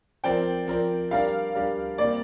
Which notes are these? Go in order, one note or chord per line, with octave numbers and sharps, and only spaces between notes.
F3 C4 A#4 D5 G5
F3 C4 A#4 D5
G3 D4 G4 A#4 D5 F5
G3 D4 G4 A#4 D5
C3 G3 A#3 D5